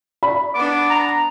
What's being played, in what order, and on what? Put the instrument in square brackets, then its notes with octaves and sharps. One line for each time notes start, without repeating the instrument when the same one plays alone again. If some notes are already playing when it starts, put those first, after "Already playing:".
[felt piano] D5 B5
[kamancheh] B3 D4 [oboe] D6
[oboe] A#5